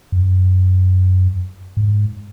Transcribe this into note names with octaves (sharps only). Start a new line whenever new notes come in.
F#2
G#2